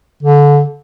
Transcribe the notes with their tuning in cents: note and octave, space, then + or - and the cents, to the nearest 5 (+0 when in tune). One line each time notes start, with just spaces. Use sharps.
D3 -25